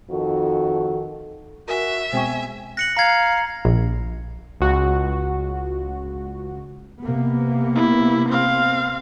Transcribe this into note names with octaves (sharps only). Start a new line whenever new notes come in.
F2 D#3 F#4 A4
F#4 A#4 E5 G#5
B2 G#3 C4 C5 G5 G#5 C#6
F#6 A#6 C#7 F#7
F5 A#5 G#6
A#1
C#2 F#4
C3 A#3 B3
E4
C4 F5